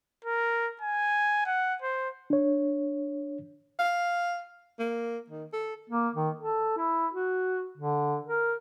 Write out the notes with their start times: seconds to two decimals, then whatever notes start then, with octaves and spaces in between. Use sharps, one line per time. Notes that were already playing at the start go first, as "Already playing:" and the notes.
0.24 A#4
0.82 G#5
1.46 F#5
1.82 C5
2.30 D4 C#5
3.79 F5
4.79 A#3
5.30 D#3
5.53 A4
5.90 A#3
6.15 D#3
6.39 A4
6.77 E4
7.13 F#4
7.77 D3
8.27 A#4